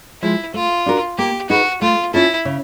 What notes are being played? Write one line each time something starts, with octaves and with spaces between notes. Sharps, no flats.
F3 G#3 E4
A3 F4
D4 F#4 A#4
A#3 G4
D#4 F#4 G#4 B4
A3 F4
C#4 E4 F4 A4
C#3